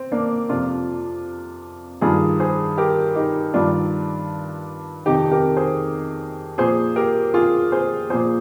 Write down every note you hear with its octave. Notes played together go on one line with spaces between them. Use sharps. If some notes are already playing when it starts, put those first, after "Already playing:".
Already playing: C4
A#3 D4
F2 C3 F3 D4 F4
G2 D#3 F4 G#4
G#4 C5
G4 A#4
D#4 G4
G2 D#3 D4 F4
F2 C3 D#3 D#4 G4
G4 A#4
G#4 C5
A#2 F3 G#4 C5
G4 A#4
F4 G#4
G#4 C5
A#2 F3 G#4 C5